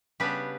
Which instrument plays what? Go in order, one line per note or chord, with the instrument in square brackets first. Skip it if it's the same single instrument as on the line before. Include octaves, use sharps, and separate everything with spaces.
[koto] C#3 G3 B3 D4 G4 B4